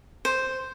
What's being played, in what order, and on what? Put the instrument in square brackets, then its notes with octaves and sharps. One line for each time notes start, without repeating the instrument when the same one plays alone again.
[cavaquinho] C5